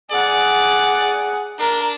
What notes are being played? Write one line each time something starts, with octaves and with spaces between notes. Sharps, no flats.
G#4 D5 F#5
D4 A#4